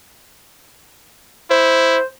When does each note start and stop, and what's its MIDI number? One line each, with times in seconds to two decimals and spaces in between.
1.51 1.98 64
1.51 2.05 72